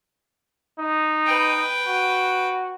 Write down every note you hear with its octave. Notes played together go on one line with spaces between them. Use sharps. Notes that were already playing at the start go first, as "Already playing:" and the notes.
D#4
B4 G5
F#4